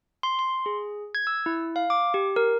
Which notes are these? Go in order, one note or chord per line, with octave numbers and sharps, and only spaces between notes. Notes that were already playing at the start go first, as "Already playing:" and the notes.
C6
C6
G#4
G#6
E6
E4
F5
D6
G4
A#4